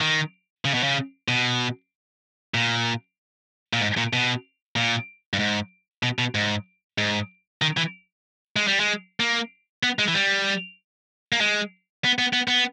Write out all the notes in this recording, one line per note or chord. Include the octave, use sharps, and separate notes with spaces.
D#3
C#3
B2
C#3
B2
A#2
A#2
G#2
A#2
B2
A#2
G2
G#2
B2
B2
G#2
G#2
D#3
E3
G#3
G3
G#3
A#3
B3
G#3
E3
G3
A#3
G#3
B3
B3
B3
B3